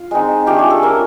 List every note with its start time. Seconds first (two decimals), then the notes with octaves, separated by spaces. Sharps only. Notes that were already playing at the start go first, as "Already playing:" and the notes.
Already playing: F4
0.11 G#3 C4 D#4
0.46 A3 D4 F4 G4
0.59 G#4
0.70 A4
0.82 A#3 C#4 F4 A#4